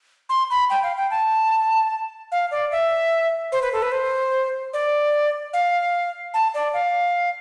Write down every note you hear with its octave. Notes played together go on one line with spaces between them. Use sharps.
C6
B5
G5
F5
G5
A5
F5
D5
E5
C5
B4
A4
B4
C5
D5
F5
A5
D5
F5